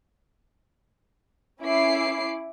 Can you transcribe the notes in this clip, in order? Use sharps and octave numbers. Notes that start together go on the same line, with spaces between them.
C#4 E4 D6 C7